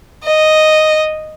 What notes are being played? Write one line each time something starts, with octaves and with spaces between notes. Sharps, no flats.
D#5